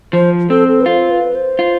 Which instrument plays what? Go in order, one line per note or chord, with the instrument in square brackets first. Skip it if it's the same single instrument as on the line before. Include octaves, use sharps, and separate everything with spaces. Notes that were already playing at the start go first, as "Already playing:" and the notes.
[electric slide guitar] F3 [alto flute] C5
[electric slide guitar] C4 [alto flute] A4
[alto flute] A4
B4
[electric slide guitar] F4 [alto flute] C5
[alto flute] B4
C5
[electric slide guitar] F4